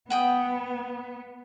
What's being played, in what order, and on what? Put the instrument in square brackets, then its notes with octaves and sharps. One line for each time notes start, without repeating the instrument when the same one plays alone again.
[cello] B3 [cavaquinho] F#5 G5 D#6